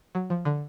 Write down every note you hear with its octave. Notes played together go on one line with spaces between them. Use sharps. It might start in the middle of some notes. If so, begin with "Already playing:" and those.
F#3
F3
D3